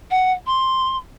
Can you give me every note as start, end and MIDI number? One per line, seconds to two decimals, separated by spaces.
0.10 0.32 78
0.46 0.96 84